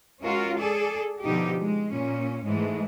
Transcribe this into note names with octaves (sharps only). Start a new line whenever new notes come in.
G#3 C#4 F4 F#4 A#4
G#4 A4 D5
B2 D3 F3 D#4 G4
G#3
A#2 C#4
G#2 E3 G#3 A3